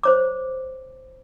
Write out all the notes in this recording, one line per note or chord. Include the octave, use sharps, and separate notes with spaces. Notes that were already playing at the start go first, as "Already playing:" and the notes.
C5 C#5 D6